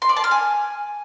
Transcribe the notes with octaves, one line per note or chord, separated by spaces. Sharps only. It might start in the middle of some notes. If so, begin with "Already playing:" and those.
C6
D5
A5
F6
G#5